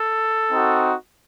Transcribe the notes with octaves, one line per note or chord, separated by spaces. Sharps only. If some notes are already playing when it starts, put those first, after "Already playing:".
Already playing: A4
C4 D#4 F#4